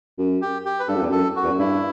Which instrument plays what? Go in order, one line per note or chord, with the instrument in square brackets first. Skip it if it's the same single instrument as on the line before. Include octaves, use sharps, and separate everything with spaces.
[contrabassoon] F#2
[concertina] G4
G4
B4
[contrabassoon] G2 [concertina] A4
[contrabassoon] F#2
E2
[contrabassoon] F#2 [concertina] A4
[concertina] F#4
[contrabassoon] E2
F#2
[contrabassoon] G2 [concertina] E4